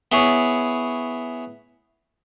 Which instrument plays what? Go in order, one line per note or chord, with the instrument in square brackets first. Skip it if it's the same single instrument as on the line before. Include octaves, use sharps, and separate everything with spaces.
[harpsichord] B3 E4 G#4 C#5